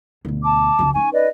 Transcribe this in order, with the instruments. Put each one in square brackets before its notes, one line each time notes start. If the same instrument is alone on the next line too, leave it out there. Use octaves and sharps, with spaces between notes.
[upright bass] D2 B2
[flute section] A5 D6
[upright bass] C#2 F#2
[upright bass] C#4 D#4 [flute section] G#5 C#6
[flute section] B4 D5 D#5